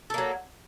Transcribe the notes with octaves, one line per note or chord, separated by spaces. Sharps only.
F#3 A#3 A4